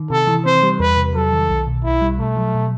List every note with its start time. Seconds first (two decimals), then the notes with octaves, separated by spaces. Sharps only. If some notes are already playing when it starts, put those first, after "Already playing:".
Already playing: D#3
0.10 C3 A4
0.27 E3
0.46 C4 C5
0.63 G3
0.80 E2 B4
0.97 C3
1.14 F#3 A4
1.33 D#3
1.49 B1
1.67 B2
1.84 B1 E4
2.01 G3
2.19 B2 A3
2.37 F#3
2.55 B2